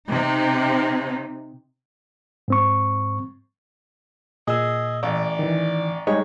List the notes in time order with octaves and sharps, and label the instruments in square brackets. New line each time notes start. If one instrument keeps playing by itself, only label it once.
[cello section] C3 D#4
[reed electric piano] G#2 C4 C#6
[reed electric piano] A#2 E6 [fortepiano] G#4 [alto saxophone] D#5
[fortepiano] A1 [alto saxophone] D5
[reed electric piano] D#3 E3
[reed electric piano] G3 G#3 D#4 [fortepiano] C#5